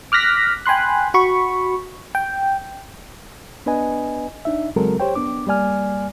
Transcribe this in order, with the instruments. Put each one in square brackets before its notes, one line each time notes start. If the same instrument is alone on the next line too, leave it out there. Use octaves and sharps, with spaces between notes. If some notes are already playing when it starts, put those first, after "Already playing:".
[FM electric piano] D6 F6 F#6 A#6 B6
G5 G#5 B5 C6 F#6
F#4 B5 C#6
G5
[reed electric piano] B3 D4 B4 D#5 G#5
D4 D#4 E5
C#3 F#3 G#3 C4 A4 A#4
G4 C5 C#5 G5
B3 D4 D6
G3 A#3 D5 G#5 F6